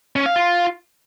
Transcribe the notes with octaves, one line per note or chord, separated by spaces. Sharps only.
C#4
F5
F4